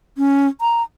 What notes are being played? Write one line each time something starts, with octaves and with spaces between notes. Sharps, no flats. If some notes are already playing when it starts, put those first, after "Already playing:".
C#4
A#5